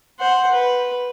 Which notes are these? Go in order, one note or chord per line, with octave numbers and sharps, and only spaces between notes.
C5 F#5
B4